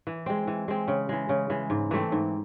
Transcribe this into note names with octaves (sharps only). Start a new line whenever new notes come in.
E3
G#3 C4
E3
G#3 C4
C#3
E3 G#3
C#3
E3 G#3
G#2
E3 A3 C4
G#2